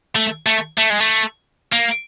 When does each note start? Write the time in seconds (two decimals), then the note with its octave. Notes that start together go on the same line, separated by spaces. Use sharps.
0.16 A3
0.46 A3
0.78 A3
0.90 G#3
1.00 A3
1.73 A#3